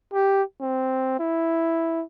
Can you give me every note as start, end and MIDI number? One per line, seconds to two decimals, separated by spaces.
0.14 0.42 67
0.61 1.18 60
1.20 2.03 64